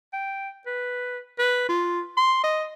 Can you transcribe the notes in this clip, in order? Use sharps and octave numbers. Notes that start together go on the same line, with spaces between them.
G5
B4
B4
F4
C6
D#5